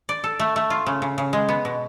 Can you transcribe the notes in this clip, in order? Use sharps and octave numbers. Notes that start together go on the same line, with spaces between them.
D5
A4
A3
A3
F4
C#3
C#3
C#3
G#3
B3
B2